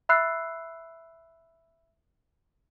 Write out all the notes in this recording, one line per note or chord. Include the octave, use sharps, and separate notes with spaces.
E5 B5 E6 F#6 C7